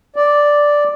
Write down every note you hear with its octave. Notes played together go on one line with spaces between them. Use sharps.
D5